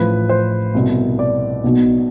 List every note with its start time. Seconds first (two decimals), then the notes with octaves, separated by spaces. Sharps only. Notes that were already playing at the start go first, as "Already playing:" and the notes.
Already playing: A1 A2 F3 B4
0.29 C5
0.75 C2 B2
1.19 D5
1.64 B1 B2